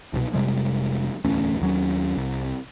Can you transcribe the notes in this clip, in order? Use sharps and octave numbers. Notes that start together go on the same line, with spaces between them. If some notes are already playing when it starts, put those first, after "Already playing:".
C2 B2
F1 C3 G3 G#3
D1 E2 A3 C#4
D#2 F#3 C#4
C2